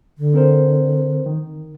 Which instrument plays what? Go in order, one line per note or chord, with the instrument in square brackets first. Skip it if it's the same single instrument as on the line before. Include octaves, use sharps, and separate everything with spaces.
[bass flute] D3
[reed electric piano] C4 A#4 C5
D#3